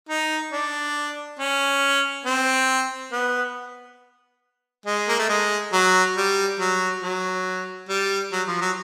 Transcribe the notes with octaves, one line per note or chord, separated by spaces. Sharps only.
D#4
D4
C#4
C4
B3
G#3
A#3
A3
G#3
F#3
G3
F#3
F#3
G3
F#3
F3
F#3